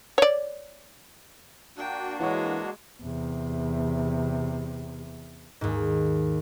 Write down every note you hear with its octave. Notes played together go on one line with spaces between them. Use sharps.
C#5 D5
A#3 D4 F#4 G5
E3 G#3 C#5 F#5 C#6
E2 C3
D#2 G#2